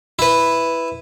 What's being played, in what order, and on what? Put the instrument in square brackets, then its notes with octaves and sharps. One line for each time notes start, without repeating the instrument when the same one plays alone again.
[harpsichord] E4 B4